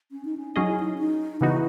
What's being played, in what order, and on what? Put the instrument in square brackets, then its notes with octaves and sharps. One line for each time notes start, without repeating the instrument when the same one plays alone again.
[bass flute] C#4
D#4
C#4
[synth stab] F#3 C#4 G#4 D#5 [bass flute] D#4
[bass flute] E4
D#4
D#4
[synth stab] C#3 E3 B3 D#4 F#4 [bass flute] E4